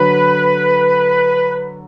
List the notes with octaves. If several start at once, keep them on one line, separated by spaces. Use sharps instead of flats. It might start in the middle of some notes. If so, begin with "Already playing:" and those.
Already playing: D3 F#3 B4